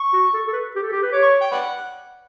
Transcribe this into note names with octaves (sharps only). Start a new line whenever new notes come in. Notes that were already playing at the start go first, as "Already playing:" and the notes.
Already playing: C#6
F#4
A4
A4
B4
G4
A4
G4
B4
C#5 D6
C#6
G5
B4 D5 F#5